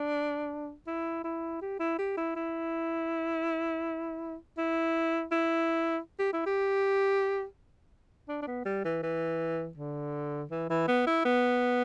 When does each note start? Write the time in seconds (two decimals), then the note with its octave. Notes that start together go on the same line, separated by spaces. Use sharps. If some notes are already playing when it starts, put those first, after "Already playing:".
Already playing: D4
0.87 E4
1.24 E4
1.62 G4
1.80 E4
1.98 G4
2.17 E4
2.36 E4
4.58 E4
5.32 E4
6.19 G4
6.33 E4
6.46 G4
8.29 D4
8.42 D4
8.47 B3
8.65 G3
8.85 E3
9.03 E3
9.77 D3
10.51 E3
10.70 E3
10.88 B3
11.07 E4
11.25 B3